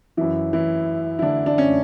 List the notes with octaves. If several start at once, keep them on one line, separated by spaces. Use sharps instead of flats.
F#2 E3 E4
E3 E4
E4
D3 D4
D4
C#4